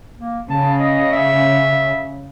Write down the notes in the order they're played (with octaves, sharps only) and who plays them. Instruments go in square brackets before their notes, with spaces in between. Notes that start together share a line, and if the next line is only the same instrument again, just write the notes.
[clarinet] A#3
[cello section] C#3 [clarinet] A5
[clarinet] D#5
E5